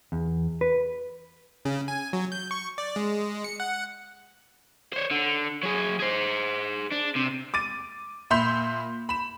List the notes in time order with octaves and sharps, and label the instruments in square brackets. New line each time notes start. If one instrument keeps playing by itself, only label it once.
[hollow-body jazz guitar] E2
B4
[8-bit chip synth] C#3
G#5
F#3
G6
C#6
D5
G#3
C#7
F#5
[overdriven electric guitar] C5 C#5
D3
F#3 G#4
G#4 C5
D4
C3
[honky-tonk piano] D6 A6 D#7
A#2 E5 B5 C6 G6 F7
B5 E7